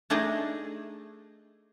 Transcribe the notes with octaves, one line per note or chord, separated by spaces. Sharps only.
A3 D4 D#4 G#4 D#5